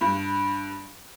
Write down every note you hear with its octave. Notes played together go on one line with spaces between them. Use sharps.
G2